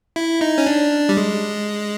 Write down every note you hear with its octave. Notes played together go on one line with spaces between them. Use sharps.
E4
D#4
C#4
D4
G3
G#3